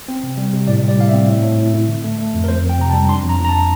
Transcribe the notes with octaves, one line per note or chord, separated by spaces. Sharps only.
C4
C3
G3
C3
A2 D5
G3 D5
A2 F5
C4 E5
A2
A2
A2
A2
D3
A3
A3
F2
A#4
F2 C5
F2
G5
C3 A#5
A5
G3
D4 C6
F2
A#5
F2
A#5
A5